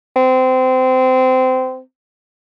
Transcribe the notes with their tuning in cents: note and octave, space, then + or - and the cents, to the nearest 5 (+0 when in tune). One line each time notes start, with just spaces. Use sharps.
C4 -25